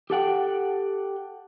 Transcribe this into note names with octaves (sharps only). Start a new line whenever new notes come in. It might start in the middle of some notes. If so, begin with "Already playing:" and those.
G4 A4 F#5 G5